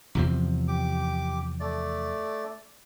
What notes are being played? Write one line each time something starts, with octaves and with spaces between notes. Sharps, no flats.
E2 C3 F3
G4 D6
A3 D5